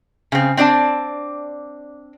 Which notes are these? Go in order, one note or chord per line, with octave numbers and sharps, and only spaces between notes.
C#3 C4
C4 D4 D5 A5